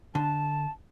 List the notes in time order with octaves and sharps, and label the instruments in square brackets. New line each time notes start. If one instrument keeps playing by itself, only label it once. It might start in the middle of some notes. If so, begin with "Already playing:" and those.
[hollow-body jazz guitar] D3 [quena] A5